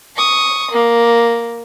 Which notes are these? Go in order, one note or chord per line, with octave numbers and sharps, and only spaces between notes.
C#6 D#6
A#3